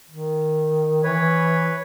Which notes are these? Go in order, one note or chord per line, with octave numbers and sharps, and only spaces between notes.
D#3
E3 B4 C#5